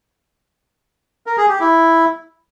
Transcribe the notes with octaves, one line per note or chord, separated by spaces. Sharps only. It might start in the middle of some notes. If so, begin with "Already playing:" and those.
A#4
G#4
G4
E4